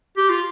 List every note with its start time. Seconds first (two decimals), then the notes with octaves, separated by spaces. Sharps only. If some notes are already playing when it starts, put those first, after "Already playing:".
0.17 G4
0.30 F4